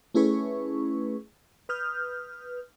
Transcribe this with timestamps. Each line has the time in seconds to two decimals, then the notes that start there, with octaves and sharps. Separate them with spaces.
0.14 A3 C#4 E4 G#4 B4 C#6
1.69 B4 D#6 F6 G6